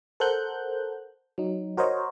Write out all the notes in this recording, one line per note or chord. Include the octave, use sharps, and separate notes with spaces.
A4 A#4 C5 F#5 F#6 G6
F#3 D#4
F#4 A#4 C5 C#5 D#5